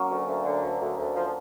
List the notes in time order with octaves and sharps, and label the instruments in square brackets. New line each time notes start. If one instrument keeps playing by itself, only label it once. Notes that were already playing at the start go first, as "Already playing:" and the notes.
Already playing: [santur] F#3 A#3 C#4
[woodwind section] D2
D2
D3
D2
D2
D2
F3